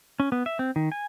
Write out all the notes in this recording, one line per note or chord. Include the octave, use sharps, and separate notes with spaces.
C#4
B3
E5
C4
D#3
G#5